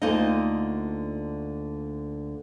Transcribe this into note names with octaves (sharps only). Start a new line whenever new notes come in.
D2 D3 A#3 D#4 F4 D#5